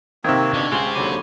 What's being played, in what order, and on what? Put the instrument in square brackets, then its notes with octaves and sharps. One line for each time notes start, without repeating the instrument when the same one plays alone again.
[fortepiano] C3 D#3 [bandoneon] A#3 C4 [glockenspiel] C#6 G#6
[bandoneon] B2 A#3 [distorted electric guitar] D3
[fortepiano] C#2 [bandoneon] F4 [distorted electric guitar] G4 C5 [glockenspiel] C#6
[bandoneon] D#2 D3 F#3 [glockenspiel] B5 D6 D#7